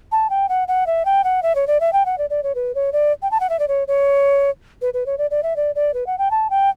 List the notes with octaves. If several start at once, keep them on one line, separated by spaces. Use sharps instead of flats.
A5
G5
F#5
F#5
E5
G5
F#5
E5
C#5
D5
E5
G5
F#5
D5
D5
C#5
B4
C#5
D5
G5
A5
F#5
E5
D5
C#5
C#5
B4
B4
C#5
D5
D5
E5
D5
D5
B4
F#5
G5
A5
G5